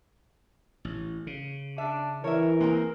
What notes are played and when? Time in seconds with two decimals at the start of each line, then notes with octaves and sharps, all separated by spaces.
0.85 A1
1.27 C#3
1.78 D4 E5
2.24 E3 A#4 C#5 E5
2.61 G#3 A#3 C4 A#5